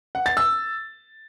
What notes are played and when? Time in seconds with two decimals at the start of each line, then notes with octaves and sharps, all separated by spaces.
0.15 F#5
0.26 A6
0.37 E6